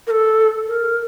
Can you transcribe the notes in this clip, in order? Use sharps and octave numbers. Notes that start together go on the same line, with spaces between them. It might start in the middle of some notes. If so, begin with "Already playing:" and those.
A#4
A4
A#4